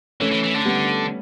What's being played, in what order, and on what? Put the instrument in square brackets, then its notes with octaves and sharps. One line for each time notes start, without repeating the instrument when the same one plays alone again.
[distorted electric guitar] E3 [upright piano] A3 C#4
[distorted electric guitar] E3
E3
D3
[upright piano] G3 B3